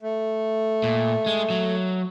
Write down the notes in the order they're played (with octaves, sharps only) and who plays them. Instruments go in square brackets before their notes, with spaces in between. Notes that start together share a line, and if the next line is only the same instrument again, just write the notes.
[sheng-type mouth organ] A3
[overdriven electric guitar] A#2
G#3
F#3